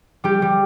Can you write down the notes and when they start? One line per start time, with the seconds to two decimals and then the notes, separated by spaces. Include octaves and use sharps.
0.24 G3 G4
0.42 G3